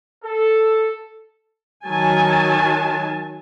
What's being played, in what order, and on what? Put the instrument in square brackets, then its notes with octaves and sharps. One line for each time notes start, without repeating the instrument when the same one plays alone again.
[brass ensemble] A4
[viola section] D#3 F#3 G#5 A5